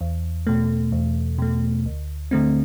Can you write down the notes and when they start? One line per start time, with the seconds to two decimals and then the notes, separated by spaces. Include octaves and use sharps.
0.01 E2
0.47 B2 A3
0.92 E2
1.38 B2 A3
1.86 D2
2.31 D3 A3 C4